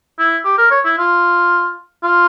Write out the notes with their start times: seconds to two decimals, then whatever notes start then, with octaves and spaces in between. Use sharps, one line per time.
0.19 E4
0.45 G4
0.58 A#4
0.71 C#5
0.85 E4
0.98 F4
2.03 F4